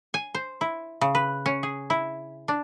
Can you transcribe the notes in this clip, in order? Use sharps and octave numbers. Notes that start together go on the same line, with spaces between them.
G#5
C5
E4
C#3
B4
C#4
G#4
E4
D4